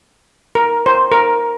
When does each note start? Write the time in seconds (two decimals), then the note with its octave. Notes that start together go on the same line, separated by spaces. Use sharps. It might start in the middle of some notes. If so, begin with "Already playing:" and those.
0.55 A#4
0.86 C5
1.12 A#4